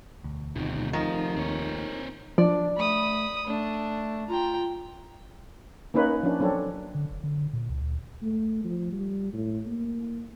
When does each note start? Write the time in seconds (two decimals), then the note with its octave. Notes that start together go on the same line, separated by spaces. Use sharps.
0.23 E1 D2
0.55 F1 B2 D#3
0.93 D#3 F3
1.36 D#2 C4 C#5
2.38 F3 D4 D5
2.77 A3 B5 D#6
3.47 A3 D4
4.29 F4 G5 A#5
5.94 A#3 C#4 D#4 B4 C#5
6.23 F3 C#4 D4
6.40 F#3 C4 D4 A4 C#5
6.95 D3
7.11 F1
7.24 D3
7.37 D3
7.53 A#2
7.70 C#2
7.81 D2
8.22 A3
8.64 F3
8.93 G3
9.33 A2
9.67 A#3